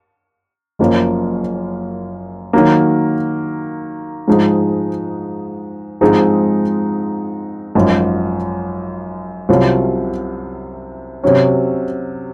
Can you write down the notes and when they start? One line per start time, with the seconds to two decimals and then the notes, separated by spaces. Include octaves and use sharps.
0.79 F#1 F#2 F3 A#3
2.53 D#3 F#3 A#3
4.28 G#2 F3 G#3 D#4
6.01 G#2 F3 G#3 C4 D#4
7.75 G#1 F#2 F3
9.49 C2 C3 F#3 C#4 F4
11.24 C3 F#3 C#4